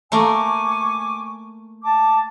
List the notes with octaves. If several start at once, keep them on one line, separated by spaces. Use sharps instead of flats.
A3 A#3 A#4 G#5 C#6 D6
A5 D6